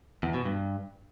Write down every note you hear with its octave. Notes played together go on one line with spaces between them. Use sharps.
E2
B2
G2